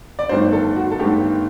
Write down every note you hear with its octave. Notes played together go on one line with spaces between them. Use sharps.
D5
G1 G2 D#3 A3 C5
A4
F#4
A4
G1 G2 D#3 A3 G4